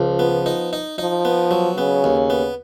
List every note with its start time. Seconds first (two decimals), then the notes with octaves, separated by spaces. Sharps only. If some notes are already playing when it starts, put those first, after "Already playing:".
Already playing: C#2 F3
0.19 B3
0.46 D#4
0.73 D#4
0.98 F3 D#4
1.25 B3
1.51 F#3
1.77 C#3 B3
2.04 D#2
2.30 B3